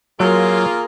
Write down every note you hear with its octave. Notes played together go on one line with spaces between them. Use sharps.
F#3 A#3 F4 G#4 A#4